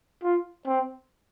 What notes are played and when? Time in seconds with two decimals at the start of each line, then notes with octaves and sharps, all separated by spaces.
0.23 F4
0.66 C4